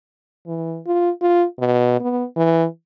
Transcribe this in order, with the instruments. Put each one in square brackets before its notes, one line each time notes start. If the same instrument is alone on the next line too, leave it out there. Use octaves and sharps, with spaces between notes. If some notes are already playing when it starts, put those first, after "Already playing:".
[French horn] E3
F4
F4
B2
B3
E3